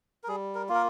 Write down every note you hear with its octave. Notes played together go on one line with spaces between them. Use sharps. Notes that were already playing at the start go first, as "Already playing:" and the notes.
A#4
G3 G#4
A#4
A#3 F4
A#4